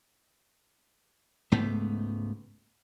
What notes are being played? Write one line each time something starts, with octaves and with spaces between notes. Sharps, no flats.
C#2 G#2 A3 B3